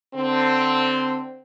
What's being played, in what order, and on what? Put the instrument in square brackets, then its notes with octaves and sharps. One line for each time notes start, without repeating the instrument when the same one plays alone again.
[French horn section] D3 C4